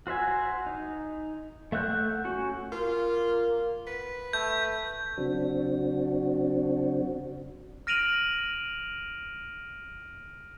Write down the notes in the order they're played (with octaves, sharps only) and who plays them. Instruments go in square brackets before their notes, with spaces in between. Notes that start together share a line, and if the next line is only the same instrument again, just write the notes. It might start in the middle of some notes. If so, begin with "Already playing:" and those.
[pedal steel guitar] F#4 C5 E5 G#5
D#4
A3 E5 F#5 F#6 G6
C#4 F#4
[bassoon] A#3 [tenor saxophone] F4
[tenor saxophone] B4
[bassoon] A3 [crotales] G6
[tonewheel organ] C#3 F#3 C4 D4 F#4
[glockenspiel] F6 A#6 D7 D#7 F7 F#7